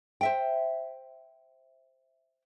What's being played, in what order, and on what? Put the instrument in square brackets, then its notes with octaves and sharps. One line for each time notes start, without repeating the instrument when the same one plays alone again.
[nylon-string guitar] C5 E5 G5